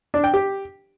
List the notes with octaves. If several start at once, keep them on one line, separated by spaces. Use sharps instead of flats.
D4
G5
G4